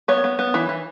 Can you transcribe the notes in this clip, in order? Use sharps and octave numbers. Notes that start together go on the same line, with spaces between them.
B3 C#5
B3
B3
E3
E3